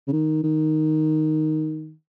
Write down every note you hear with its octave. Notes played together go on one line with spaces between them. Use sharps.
C#3
D#3
D#3